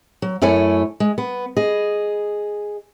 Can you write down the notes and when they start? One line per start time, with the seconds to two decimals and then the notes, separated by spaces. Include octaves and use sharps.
0.22 F#3
0.42 F#2 A3 E4 C#5 G#5
1.00 G#3
1.18 B3
1.57 G#4 D#5